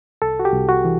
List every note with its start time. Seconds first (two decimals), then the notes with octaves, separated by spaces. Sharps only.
0.22 C2 A4
0.39 F#4
0.45 G4
0.53 C2
0.69 F#4
0.85 E3